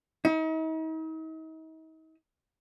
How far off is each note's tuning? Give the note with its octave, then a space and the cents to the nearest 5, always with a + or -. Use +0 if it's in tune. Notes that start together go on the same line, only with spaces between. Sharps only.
D#4 +40